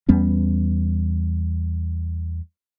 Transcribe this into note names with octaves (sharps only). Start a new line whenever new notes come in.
E2 G3 B3 C#4